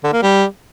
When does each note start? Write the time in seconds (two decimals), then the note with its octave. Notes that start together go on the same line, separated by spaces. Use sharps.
0.04 D3
0.13 A#3
0.22 G3